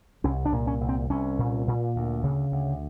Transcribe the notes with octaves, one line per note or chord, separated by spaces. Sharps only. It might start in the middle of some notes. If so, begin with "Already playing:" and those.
C2 C#4
D4
A#2
C#4
C2
C4
C2 C#4
A#2
A#2
D2
C#3
D2